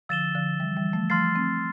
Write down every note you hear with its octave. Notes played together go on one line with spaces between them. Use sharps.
D3 F3 E6 A6 E7 G7
D3 F3
E3 G3
E3 G3
F3 A3
F3 A3 C6 F6 A6 C7
A3 C4